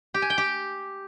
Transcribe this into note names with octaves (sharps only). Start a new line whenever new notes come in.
G4
G#5
G5
G4